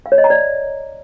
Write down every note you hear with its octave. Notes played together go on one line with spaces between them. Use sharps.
F5
C#5
D#5
A#5
D5